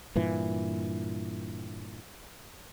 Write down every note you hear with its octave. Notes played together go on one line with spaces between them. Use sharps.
G2 A#2 E3